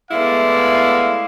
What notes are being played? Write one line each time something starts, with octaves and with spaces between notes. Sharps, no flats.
G#3 A3 B3 E4 D5 F5